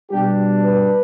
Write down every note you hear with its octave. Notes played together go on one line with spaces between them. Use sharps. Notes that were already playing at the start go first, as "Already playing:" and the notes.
B2 G3 D4 G4
B4